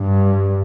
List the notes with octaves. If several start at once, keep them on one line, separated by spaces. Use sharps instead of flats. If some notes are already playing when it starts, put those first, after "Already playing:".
Already playing: G2